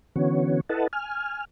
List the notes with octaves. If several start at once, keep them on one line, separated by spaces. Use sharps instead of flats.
D3 E3 B3 C#4 F#4 C#5
E4 A4 B4 D#5 F#5 A5
G#5 F6